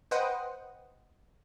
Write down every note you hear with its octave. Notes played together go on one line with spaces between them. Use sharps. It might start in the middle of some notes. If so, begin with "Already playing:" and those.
B4 C5 D#5 F#5 G5 D#6